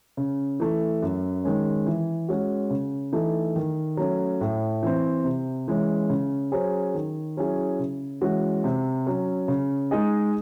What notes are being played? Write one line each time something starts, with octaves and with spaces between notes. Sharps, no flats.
C#3
E3 A3
F#2
D#3 G#3 C#4
E3
G#3 C#4 F#4
C#3
E3 A3 D#4 A4
D#3
F#3 A3 C#4
A2
E3 C4
C3
E3 G#3 C#4
C#3
F#3 C#4 G#4 C5
D#3
F#3 C#4 E4 G#4
C#3
E3 G#3 C#4 F#4
C3
F#3 C#4
C#3
G#3 D#4 G#4 D#5